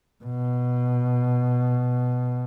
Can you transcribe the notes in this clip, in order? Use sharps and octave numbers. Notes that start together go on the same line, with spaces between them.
B2